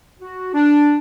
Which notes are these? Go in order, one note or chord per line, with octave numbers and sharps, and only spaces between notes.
F#4
D4